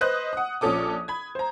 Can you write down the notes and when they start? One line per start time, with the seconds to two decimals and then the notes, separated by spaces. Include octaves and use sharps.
0.01 B4 C5 D#5 F#6
0.33 F#5 D#6
0.61 A#1 F3 C#4 A4 D6 D#6
1.08 B5 G#6
1.35 C5 A#5